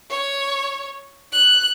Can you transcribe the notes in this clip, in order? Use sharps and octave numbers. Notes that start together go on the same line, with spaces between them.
C#5
F#6